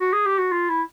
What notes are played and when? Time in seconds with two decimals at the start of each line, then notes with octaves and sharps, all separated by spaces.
0.01 F#4
0.13 G#4
0.26 G4
0.38 F#4
0.52 F4
0.69 E4